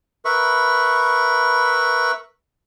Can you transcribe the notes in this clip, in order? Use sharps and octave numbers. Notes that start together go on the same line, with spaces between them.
A#4 B4 E5 B5 C#6